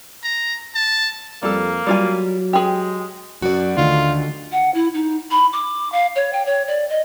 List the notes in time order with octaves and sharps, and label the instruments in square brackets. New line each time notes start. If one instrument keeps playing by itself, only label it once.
[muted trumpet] A#5
A5
[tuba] F2 [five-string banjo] G3 A4 [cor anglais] A#3
[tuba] F#3 [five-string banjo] G3 F4 G#5
[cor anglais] G#3 [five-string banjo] G4 G#4
[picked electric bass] F#2 [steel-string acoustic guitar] F#4 D5
[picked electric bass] D2 [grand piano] D3 D#3 D4 [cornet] F4
[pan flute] F#5
E4
D#4
B5
D6
F5
C#5
G5
C#5
D5
D#5